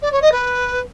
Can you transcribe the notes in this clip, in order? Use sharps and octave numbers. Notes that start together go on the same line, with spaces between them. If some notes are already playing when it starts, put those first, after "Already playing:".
D5
C#5
D#5
B4